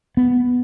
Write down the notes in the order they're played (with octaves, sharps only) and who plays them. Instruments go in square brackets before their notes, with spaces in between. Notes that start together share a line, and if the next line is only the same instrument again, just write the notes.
[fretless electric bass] B3